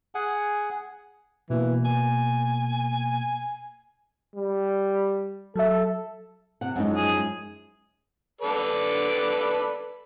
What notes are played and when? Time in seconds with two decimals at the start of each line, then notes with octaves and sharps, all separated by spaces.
0.15 G#4 F#5 G#5
1.50 B2 E3 A#3
1.85 G#5
4.36 G3
5.56 F#3 A4 E5
6.61 C3 F#5
6.76 F#2 F3 G#3 D#4
6.96 G#4
8.41 A4 B4 D5